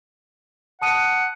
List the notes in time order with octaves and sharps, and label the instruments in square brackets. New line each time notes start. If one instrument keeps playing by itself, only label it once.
[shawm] F#5 [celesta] A5 D#6 D#7